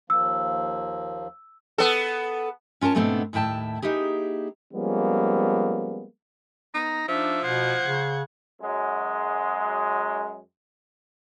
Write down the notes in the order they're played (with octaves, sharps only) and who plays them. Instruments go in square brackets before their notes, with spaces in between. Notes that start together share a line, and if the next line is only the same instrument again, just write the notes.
[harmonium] D#2 F3 A#3 [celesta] E6
[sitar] B3 A4
[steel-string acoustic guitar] C#4 F4 A#4 C#5 A5
G#2 B2 A3 B3 C4 D4
D#2 A2 E4 G5 A5
A#3 D#4 E4 G4 G#4
[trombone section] F3 G3 G#3 A#3 B3 C#4
[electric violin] B3 [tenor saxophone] D#4 [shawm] A#5
[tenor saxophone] F3 [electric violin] D4 D#4 [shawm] E5
[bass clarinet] B2 [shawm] C5 [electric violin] F#5 G#6
[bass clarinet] C#3
[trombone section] F#2 F#3 G#3